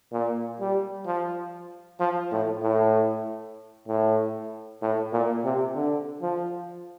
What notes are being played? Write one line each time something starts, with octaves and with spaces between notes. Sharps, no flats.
A#2
G3
F3
F3
A2
A2
A2
A2
A#2
C3
D3
F3